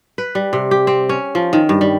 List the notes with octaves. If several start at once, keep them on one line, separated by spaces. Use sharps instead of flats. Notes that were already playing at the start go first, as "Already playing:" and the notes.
B4
G3
C3
G4
C4
C#4
F3
D#3
G2
G3